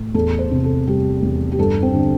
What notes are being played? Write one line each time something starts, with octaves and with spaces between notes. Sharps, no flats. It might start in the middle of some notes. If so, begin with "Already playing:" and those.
Already playing: A2
E2 A4
C5
C3
A4
G3 G4
E2
G4
G2 A4
C4
D3